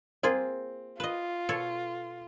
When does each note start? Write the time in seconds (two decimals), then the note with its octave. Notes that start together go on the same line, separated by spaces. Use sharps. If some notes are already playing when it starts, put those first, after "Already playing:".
0.23 A#3 C4 F4 G#4
1.00 F4 B4 D#5
1.49 B2 A4 C#5